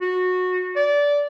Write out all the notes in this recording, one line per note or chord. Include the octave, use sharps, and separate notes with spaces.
F#4
D5